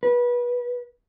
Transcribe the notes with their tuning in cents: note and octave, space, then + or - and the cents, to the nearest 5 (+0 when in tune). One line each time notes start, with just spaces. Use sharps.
B4 -25